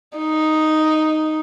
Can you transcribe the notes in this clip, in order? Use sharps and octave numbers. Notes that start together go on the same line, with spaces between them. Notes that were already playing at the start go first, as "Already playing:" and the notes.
D#4